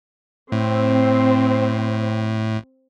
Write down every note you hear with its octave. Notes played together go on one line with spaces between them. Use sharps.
A2 C4